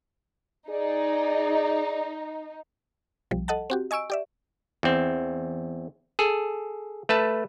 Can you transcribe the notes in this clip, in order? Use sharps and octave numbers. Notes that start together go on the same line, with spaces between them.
D#4 G#4 D5
B1 F3 G3
A4 D#5 F#5 A5
C4 F#4 G4
D#5 G#5 C#6 E6 D7
G4 D5 E5
E2 C4
G#4 A4
A3 B4 A5